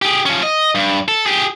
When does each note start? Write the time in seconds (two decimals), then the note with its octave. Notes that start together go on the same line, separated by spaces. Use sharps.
0.02 G4 G#4
0.26 F3 C#4
0.43 D#5
0.75 G2
1.08 A4
1.26 G4 G#4